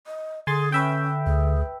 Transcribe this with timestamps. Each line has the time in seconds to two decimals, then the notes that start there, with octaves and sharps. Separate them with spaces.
0.06 D#5
0.47 D3 G#4 G#5 C6 A6
0.72 C#4 B4 E5 G5
1.27 D2 G#4